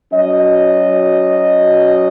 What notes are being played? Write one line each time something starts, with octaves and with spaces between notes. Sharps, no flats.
F#3 C#4 F#4 D#5